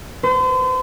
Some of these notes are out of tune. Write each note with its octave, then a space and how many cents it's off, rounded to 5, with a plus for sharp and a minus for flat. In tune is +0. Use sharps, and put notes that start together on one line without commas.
C5 -40